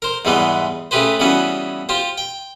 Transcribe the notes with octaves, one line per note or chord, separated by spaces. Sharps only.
A#4 C5
E2 G#2 E3 G3 G#3 B3
C#3 A3 G4 G#4 B4 C5
C#3 E3 G3 B3 C#4 F#4
F4 G4 C5
G5